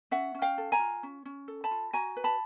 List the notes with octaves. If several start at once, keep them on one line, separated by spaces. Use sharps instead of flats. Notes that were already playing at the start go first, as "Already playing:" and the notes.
C#4 E5 F#5
C#4
F5 G5
A4
G#5 A#5
F4
C#4
C#4
A4
A5 B5
F4
F#4 G#5 A#5
B4
A5 B5